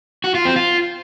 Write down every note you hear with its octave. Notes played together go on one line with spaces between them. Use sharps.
F#4
F4
C4
F4